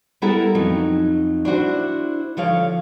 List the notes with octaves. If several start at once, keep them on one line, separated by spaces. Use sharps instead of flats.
G3 B3 E4 A4 A#4 F#5
F2 F#3 D#4
D4 E4 F#4 C5
D3 F3 C#5 F5